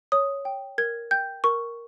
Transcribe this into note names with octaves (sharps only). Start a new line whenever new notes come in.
C#5 D#6
G5
A#4 G#6
G5 G6
A#4 C#6